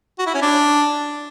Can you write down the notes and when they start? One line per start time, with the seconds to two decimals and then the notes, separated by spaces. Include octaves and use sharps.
0.19 F#4
0.27 E4
0.34 C#4
0.42 D4